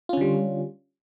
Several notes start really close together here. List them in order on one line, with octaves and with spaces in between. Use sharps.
F4 C#4 D3 G3